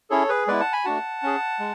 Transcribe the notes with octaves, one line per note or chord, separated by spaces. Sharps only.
C#4 E4 G#4 A4 C#5
G#4 B4
G#3 B3 E4 B4 D5
F#5 A5
G#5 B5
A3 D4 F#4 F#5 A5
C#4 G#4
G#3